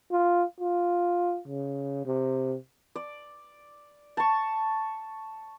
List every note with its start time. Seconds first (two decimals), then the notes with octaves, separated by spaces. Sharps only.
0.11 F4
0.61 F4
1.48 C#3
2.06 C3
2.96 D5
4.17 A5 C#6